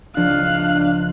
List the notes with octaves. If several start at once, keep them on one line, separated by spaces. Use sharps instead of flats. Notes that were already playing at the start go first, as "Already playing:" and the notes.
C#2 F3 D4 F5 F#6